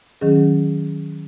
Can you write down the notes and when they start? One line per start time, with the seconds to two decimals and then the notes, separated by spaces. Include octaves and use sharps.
0.21 D#3 F#3 C#4 G#4